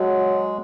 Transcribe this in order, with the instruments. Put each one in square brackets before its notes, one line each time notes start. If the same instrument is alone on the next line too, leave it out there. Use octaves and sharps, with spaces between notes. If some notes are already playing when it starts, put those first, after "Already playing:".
Already playing: [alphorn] F#3 [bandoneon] G#3